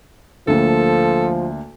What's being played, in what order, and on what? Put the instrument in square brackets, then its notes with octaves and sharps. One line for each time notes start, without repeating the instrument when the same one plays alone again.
[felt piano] D2 A#3 [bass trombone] F3 [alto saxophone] A4